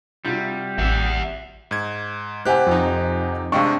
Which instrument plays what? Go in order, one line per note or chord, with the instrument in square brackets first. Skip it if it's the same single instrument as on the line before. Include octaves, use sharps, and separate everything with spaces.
[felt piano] C3 F4 F#4 [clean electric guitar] G3
[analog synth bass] A1 [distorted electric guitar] E5 F#5
[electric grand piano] G#2 G#6
[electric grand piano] C3 G4 F#6 [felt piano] C5 F#5 G#5
[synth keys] F2 D#4
[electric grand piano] C3 G#3 D4 [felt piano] F5 G5 C#6